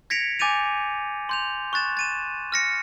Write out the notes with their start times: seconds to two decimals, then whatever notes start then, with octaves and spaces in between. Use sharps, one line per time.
0.10 G#6 A#6 B6 C#7 D7 F7
0.39 G#5 D6 G6 A6 D#7 F7
1.29 C6 G6 F7
1.73 C#6 F#6 A6 E7
1.97 A6 D#7 E7
2.52 F6 A#6 C#7